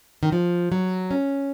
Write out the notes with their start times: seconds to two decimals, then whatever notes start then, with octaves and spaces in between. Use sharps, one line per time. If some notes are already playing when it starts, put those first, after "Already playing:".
0.23 D#3
0.32 F3
0.72 F#3
1.11 C#4